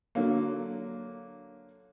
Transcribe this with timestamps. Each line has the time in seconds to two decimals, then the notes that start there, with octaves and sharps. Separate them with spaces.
0.15 D3 F#3 A#3